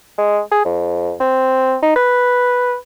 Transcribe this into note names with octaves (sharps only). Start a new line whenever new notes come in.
G#3
G#4
F2
C4
D#4
B4